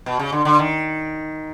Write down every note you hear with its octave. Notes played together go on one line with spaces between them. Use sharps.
B2
C#3
D3
D3
D#3